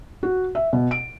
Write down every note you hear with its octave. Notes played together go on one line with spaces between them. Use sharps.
F#4
E5
B2
D7